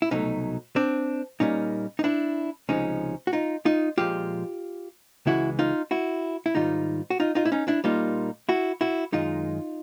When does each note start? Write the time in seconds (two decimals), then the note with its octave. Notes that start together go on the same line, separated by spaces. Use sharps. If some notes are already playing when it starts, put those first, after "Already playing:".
0.02 E4
0.11 C2 B2 F#3 A3 C#4 D#4
0.76 C4 D4
1.40 A#2 G3 A#3 C#4 D#4
1.99 D#4
2.04 D4 E4
2.69 C#2 C3 F3 G#3 C#4 D#4
3.27 F#4
3.33 D#4 F4
3.65 D#4 F4
3.98 A#2 F3 G#3 F4 G4
5.26 C#2 C#3 E3 G#3 E4 F#4
5.59 D#4 F4
5.91 E4 F#4
6.46 E4
6.55 G#2 D#3 G3 D#4 F4
7.10 F#4
7.20 D#4 F4
7.35 D#4 F4
7.45 E4
7.52 C#4 D#4
7.68 D4 E4
7.84 A#2 G3 A#3 D#4 F4
8.49 E4 F#4
8.81 E4 F#4
9.12 F#2 D#3 G#3 D#4 F4